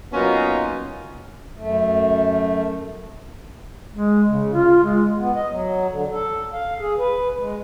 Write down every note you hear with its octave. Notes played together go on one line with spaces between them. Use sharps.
F#3 A#3 B3 C#4 D#4 F4
F#2 A3
G#3
C#3
F4
G#3
B3
D#5
F#3
D3
A4
F5
G#4
B4
G#3